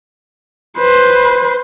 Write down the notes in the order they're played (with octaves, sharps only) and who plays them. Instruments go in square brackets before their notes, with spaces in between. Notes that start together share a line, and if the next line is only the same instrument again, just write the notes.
[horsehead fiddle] B4 C5